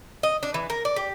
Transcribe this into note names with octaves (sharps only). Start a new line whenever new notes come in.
D#5
D4
E3
A#4
D5
G4